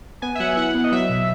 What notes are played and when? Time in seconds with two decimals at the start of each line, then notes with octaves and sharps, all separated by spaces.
0.22 B3 G#5
0.35 E5
0.40 F#3 F#5
0.57 E4 F#5
0.74 B3
0.84 D#5
0.92 F#3 E5
1.09 B2